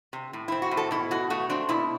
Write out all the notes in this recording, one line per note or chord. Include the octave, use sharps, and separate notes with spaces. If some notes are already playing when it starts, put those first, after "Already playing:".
C3
A2
C4 E4
F#4
A2
A4
B2 E4
B2 F#4
A3 F#4
C4 D4
B2 E4